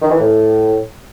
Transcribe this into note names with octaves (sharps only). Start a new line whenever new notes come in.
D#3
E3
A2